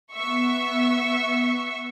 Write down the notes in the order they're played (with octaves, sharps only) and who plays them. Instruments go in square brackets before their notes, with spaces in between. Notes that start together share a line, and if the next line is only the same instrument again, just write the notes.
[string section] B3 E5 C#6